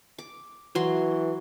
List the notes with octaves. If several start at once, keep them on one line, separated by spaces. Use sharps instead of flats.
D6
E3 F#3 C6